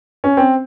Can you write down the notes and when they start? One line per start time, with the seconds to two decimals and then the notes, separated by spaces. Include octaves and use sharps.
0.24 C#4
0.37 C4